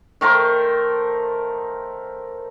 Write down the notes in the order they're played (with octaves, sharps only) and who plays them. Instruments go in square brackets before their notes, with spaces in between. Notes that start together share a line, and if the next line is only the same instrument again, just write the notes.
[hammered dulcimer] D#3 A3 A#4 C5